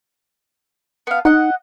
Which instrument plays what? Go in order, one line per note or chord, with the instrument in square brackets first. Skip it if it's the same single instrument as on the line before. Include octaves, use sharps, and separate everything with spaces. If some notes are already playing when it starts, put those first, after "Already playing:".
[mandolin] B3 F5
[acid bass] D#4 [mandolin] D#5 F#5